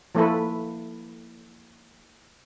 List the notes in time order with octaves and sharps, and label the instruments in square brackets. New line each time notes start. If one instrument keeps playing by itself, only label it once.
[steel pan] F3 A3 A#3 E4 A4 B4